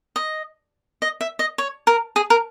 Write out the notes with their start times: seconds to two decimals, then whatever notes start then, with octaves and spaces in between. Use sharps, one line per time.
0.16 D#5
1.02 D#5
1.21 E5
1.39 D#5
1.58 C#5
1.87 A#4
2.16 G#4
2.30 A#4